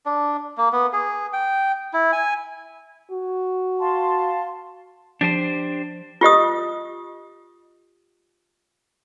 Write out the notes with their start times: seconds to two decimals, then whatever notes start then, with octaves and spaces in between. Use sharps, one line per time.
0.06 D4
0.58 A#3
0.73 B3
0.93 G#4
1.33 G5
1.93 E4
2.12 G#5
3.11 F#4
3.79 F5 A5 C6
5.21 F3 D4 G4 C5
6.21 F4 G4 D#5 D#6